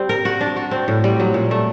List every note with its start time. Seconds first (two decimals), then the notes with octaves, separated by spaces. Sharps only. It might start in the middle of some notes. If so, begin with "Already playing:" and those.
Already playing: G3 C4
0.09 A#4
0.25 F#4
0.41 D4
0.56 F#4
0.71 C4
0.88 A2
1.04 G3
1.20 F#3
1.34 A#2
1.51 A3